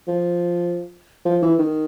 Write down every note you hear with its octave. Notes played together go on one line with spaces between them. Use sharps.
F3
F3
E3
D#3